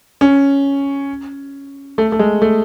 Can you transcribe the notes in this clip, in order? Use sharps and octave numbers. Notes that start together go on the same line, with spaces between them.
C#4
A3
A3
G#3
A3